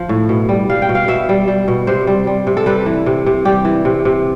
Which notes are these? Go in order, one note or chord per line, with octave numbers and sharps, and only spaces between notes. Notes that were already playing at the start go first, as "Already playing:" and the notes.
Already playing: F3
A2
B2
G3
G3 F5
G5
B2
F5
B2 E5
G3
G3
B2
C3 C5
G3
G3
C3
A4
G3 B4
E3
C3
C3
G3 G4
E3
C3
C3